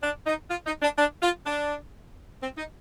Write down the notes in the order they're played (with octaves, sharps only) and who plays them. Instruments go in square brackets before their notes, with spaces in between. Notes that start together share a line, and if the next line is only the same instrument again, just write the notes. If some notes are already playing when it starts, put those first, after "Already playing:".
[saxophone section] D4
D#4
F4
D#4
D4
D4
F4
D4
C4
D#4